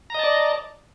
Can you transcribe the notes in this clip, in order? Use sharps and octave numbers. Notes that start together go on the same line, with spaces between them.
D5 D#5 A5 A#5